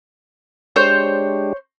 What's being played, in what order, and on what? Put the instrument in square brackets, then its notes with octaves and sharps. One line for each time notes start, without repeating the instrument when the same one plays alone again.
[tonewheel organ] G#3 D4 G4 [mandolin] C5 C#5 G6